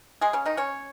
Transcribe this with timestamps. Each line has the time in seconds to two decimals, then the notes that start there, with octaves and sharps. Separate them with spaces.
0.21 G#3 G#4
0.33 C#3 C#4
0.46 D#3 D#4
0.57 C#4 C#5